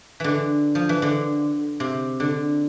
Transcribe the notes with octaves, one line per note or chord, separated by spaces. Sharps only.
D3 E3
F3
E3
D3
C3
D3